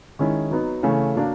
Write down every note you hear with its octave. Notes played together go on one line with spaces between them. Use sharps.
D#3 G#3 C#4 E4
F#3 B3 D#4
C#3 E3 A3 C#4
F#3 A#3 D4